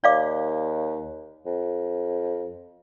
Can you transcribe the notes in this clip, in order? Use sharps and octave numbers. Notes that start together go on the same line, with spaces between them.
D#2 D5 F5 D6
F2